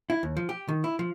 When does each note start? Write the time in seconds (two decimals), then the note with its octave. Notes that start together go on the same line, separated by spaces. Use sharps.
0.10 E4
0.23 D#2
0.37 F3
0.49 G4
0.68 D#3
0.84 E4
0.99 F3